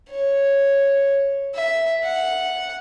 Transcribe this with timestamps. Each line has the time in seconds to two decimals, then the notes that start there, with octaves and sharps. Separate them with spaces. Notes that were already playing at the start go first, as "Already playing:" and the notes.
0.10 C#5
1.54 E5
2.03 F#5